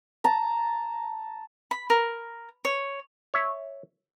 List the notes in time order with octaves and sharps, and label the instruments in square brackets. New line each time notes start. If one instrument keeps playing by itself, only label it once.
[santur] A5 A#5
[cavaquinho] B5
A#4
C#5
[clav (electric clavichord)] C#5 E5